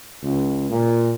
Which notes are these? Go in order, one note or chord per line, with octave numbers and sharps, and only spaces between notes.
C#2
A#2